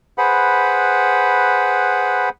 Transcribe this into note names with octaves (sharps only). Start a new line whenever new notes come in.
G#4 B4 C5 F#5 B5